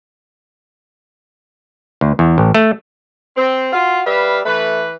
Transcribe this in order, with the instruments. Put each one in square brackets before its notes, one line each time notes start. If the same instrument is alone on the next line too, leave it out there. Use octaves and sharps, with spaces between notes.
[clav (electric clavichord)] D2
E2
A1
A3
[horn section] C4
[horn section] F4 [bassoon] F#4
[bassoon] G3 [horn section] B4 E5 F5
[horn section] E3 B4 [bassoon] A3